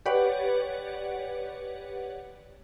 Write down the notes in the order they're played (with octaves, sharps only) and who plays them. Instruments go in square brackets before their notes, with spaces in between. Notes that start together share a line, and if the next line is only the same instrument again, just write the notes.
[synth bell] G4 B4 C#5 D5 F#5